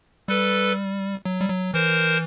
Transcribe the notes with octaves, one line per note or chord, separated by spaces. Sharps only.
G3 A4 B4
F#3
G3
F#3
E3 A#4 C5